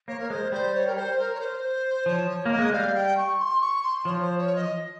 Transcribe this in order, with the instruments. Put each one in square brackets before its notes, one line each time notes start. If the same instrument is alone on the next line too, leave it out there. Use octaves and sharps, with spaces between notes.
[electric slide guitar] A#3 [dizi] C#5
[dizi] A#4
[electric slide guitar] G#3 [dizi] C5
[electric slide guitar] G3 [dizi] C5
[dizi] C#5
A#4
C5
A#4
C#5
C5
[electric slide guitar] F3 [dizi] C#5
[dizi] C#5
[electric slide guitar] A#3
[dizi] D#5
[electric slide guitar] G#3
[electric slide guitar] G3 [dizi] F5
[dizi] G5
C#6
C6
C#6
C6
[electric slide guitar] F3 [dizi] C#5
[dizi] C5
C#5
D#5